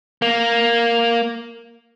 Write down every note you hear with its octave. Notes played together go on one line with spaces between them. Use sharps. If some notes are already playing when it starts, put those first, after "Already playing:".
A#3